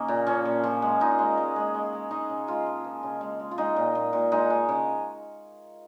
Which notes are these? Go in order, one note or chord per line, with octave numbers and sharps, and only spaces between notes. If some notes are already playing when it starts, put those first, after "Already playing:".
Already playing: C#3 A#3 C#4 D#4
A#2
F3 C#4
A#2
F3
G#3
A#2 D#4
G#3
G#3
G#3
G#3
G#3
G#3 D#4
C#3
G#3 F4
F3
F3
C#3
G#3
G#3
F4
G#3 D#4
A#2
A#2
A#2
G#3 D#4
G#3
C#3